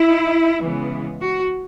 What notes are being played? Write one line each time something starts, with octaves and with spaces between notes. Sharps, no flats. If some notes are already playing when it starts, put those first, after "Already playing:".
Already playing: E4
C#3 E3 G#3 B3
F#4